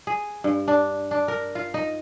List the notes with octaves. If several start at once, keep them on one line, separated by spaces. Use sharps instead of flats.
G#4
G2
D4
D4
A#4
F4
D#4